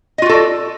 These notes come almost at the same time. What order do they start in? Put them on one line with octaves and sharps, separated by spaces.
D#5 F4 F#4 A4 D5